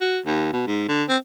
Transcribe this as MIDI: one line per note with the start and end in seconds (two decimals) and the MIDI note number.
0.01 0.19 66
0.26 0.51 39
0.53 0.62 47
0.67 0.84 44
0.88 1.03 50
1.09 1.17 60